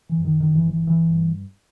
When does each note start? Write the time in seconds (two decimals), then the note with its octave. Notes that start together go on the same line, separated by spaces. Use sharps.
0.09 E3
0.17 F#2
0.25 D#3
0.40 G1 D#3
0.55 E3
0.64 G1
0.71 E3
0.86 G1 E3
1.10 G2